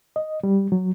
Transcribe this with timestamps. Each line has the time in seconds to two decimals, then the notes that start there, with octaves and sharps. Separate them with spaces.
0.16 D#5
0.44 G3
0.72 F#3